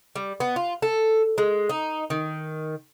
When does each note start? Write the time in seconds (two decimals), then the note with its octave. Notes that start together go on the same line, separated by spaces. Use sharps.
0.16 G3
0.40 B3
0.56 F4
0.82 A4
1.38 G#3
1.69 D#4
2.10 D#3